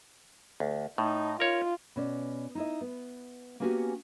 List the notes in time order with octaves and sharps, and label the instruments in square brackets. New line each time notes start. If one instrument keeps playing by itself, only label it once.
[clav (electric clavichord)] D2
[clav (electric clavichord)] A2 [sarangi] D#4
[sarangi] F4 [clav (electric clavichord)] A#4 C#5
[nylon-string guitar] B2 C#4 D5
D#4 E4 D#5
B3
A#3 B3 C#4 F#4 G4 G#5